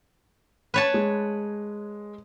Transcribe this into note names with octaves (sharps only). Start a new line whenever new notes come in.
B4 C#5 A5
G#3